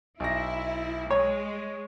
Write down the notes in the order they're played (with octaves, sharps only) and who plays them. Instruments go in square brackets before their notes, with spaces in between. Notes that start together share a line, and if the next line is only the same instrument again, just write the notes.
[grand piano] B1 A#6 [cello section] E4
[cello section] G#3 [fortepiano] C#5